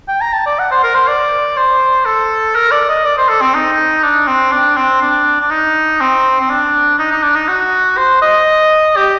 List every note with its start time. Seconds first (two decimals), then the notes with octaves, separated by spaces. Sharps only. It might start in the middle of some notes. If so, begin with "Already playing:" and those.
0.08 G5
0.21 A#5
0.33 A5
0.46 D5
0.59 F#5
0.71 C5
0.83 A#4
0.95 C5
1.08 D5
1.57 C5
2.06 A4
2.55 A#4
2.71 D5
2.89 D#5
3.05 D5
3.18 C5
3.29 A4
3.41 C4
3.54 D#4
4.03 D4
4.27 C4
4.52 D4
4.76 C4
5.02 D4
5.41 D4
5.51 D#4
6.01 C4
6.41 C4
6.50 D4
6.99 D#4
7.11 D#4
7.23 D4
7.36 D#4
7.48 F#4
7.97 C5
8.22 D#5
8.96 G4